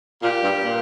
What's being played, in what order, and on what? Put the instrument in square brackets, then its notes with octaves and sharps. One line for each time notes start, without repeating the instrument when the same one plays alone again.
[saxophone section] A#2 [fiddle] G4
[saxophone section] G2
A#2